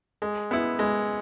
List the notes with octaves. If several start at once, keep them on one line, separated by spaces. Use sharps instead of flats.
G#3
B3 E4
G#3